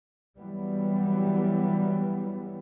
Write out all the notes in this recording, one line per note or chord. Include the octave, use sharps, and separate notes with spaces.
E3 F#3 G3 B3